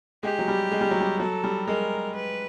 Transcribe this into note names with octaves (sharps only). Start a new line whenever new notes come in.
G#3 G4
F#3
G3
G#3
G3
F#3
G3
F#3 A4
G3
G#3 A#4
B4